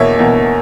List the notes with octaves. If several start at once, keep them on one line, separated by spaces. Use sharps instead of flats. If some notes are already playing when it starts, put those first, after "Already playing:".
Already playing: E2 B2 A#3 C#5 E5
E2 B2 A#3